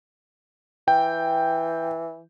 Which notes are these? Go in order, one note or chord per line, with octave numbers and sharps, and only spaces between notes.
E3 G5